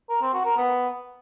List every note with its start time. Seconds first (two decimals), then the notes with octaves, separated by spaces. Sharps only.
0.10 A#4
0.21 C4
0.33 F#4
0.45 A#4
0.57 B3